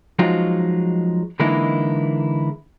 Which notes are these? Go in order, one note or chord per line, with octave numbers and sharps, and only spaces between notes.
F3 F#3 G#3 D#4 F4 F#4
D3 E3 G#3 A#3 D#4 E4